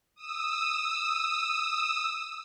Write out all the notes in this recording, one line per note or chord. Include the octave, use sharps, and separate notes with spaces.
D#6 E6